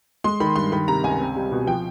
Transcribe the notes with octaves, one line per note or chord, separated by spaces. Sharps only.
G#3 C6
D#3 B5
G2 C6
D#3 B5
C3 A#5
C#2 G#5
C4
G3
B2
F3 G5